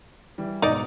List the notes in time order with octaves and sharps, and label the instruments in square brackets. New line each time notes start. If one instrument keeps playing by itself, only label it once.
[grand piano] E3 G3
[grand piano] G#2 B2 [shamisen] D#4 D5 [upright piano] D#5